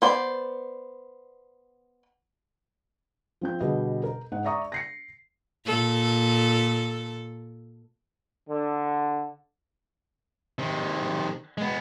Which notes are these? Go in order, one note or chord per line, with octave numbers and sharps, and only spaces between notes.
B3 C5 D5
F3 C4 G6
B2 D3 G3 G#4 D#5
A#4
G#2 G#3 F#5
D5 E5 A#5 C#6 D#6
A#6 C7 C#7
A#2 A4
D3
C3 D#3
G#3 B3